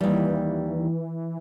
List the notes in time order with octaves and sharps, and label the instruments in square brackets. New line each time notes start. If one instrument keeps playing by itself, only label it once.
[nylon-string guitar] D#2 G3 [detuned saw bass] E3